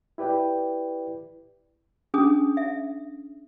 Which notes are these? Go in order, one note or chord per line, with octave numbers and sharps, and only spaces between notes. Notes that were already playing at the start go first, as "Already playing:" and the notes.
E4 G4 B4 D5 G5
C#4 D4 G#4 D#6
E5